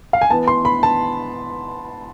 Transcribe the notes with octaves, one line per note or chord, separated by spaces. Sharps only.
F5
G#5
E3 B3 A5
C6
B5
A5